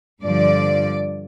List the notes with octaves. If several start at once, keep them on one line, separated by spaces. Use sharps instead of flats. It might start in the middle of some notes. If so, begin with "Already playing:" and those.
G2 D3 F3 D5